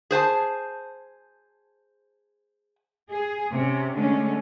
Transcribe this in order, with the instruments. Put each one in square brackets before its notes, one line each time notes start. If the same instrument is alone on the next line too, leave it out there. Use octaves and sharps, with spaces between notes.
[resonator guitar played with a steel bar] G#4 C5 G#5 A5
[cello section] G#4
C3 C#4
D3 G#3 A3 C#4